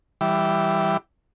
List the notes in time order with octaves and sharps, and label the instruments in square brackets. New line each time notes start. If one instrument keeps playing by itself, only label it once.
[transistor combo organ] E3 G3